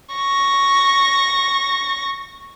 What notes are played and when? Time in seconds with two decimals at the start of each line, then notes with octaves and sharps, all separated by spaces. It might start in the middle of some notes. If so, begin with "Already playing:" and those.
0.15 C#6 A#6